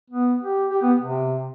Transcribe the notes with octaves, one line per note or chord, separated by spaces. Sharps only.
B3
G4
G4
B3
C3